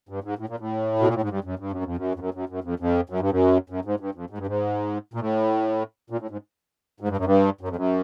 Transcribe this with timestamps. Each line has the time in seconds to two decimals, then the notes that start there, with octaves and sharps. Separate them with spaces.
0.09 G2
0.24 G#2
0.39 A2
0.49 A#2
0.60 A2
0.99 B2
1.07 A#2
1.14 A2
1.22 G#2
1.29 G2
1.44 F#2
1.59 G2
1.72 F#2
1.84 F2
1.97 F#2
2.15 F2
2.19 F#2
2.34 F#2
2.49 F#2
2.64 F2
2.80 F2
3.10 F#2
3.20 G2
3.31 F#2
3.70 F#2
3.85 G#2
4.00 G2
4.15 F2
4.30 G#2
4.38 G2
4.47 G#2
5.14 A#2
5.20 A2
6.10 A#2
6.20 A2
6.30 G#2
7.00 G#2
7.09 G2
7.17 F#2
7.25 G2
7.61 F#2
7.68 F2
7.76 F#2